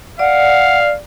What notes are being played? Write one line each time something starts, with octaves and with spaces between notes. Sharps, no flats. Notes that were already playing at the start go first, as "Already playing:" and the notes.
D5 F5 F#5